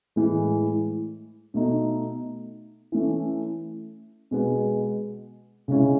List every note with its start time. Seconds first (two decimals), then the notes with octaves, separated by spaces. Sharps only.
0.16 A2 E3 G#3
1.54 B2 A3 D#4
2.92 E3 A3 C#4 E4
4.31 B2 G#3 B3
5.68 C#3 G#3 C#4 E4